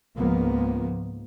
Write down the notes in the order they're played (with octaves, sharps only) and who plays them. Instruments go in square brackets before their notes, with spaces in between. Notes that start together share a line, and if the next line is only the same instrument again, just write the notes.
[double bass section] C#2 G#2 F3 A#3 B3